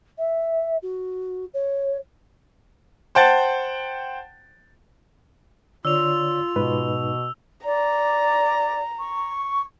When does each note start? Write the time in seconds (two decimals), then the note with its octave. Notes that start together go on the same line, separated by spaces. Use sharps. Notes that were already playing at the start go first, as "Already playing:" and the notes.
0.18 E5
0.82 F#4
1.54 C#5
3.15 C5 F#5 G5 A5 A6
5.85 D3 F4 C#5 D5 E6 F7
6.56 G#2 B2 D#4 B4
7.65 D5 A#5
8.99 C#6